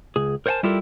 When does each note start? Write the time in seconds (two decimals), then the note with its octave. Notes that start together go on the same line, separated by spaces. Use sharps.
0.16 C#2 G#4
0.46 A#4 C5 C#5 F#5 G#5 A5
0.63 G3 E4 F4 G4 A4 A#4